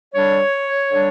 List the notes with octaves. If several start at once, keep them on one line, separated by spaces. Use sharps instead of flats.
D3 G3 D4 C#5
D3 G3 D4